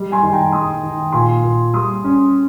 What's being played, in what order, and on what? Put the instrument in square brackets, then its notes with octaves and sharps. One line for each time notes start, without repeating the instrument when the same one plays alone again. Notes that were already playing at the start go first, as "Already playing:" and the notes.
Already playing: [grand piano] G3 G#3
[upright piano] G#5 C6
[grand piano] D#3
[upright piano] G5 A#5
[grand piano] G#3 [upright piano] C6 D#6
[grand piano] D#3
[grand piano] A#2 [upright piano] G#5 C6
[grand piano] A#2
[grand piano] G3 [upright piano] C6 D#6
[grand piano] C#4